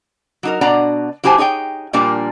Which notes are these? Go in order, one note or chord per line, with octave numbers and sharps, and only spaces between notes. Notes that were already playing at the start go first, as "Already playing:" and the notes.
F#3 D#4 A#4
B2 D4 D5 F#5 A#5
F#3 E4 G4 C5 G#5 A5
D#4 G#4 C#5 G5
A#2 F3 G3 A#3 D4 A#4